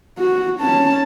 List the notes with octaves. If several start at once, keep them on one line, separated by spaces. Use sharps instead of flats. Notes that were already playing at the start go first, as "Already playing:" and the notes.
F#4
C#4 A5